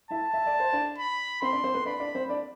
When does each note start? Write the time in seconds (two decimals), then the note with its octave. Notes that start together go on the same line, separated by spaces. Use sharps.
0.11 E4 E5 A5
0.34 E5
0.46 D5
0.60 C5
0.73 D4 D5
0.98 B5
1.42 C4 C5 C6
1.53 D4 D5
1.64 C4 C5
1.74 B3 B4
1.86 D4 D5 B5
2.00 D4 D5
2.15 C4 C5
2.29 D4 D5